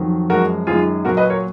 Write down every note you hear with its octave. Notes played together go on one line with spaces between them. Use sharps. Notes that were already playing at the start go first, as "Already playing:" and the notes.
Already playing: F2 D#3 F#3
F#2 F3 G#3 F#4 A#4
F#2 D#3 G#3 F4 G#4
A#2 F#3 F#4 A#4
B4 D#5
A#4 C#5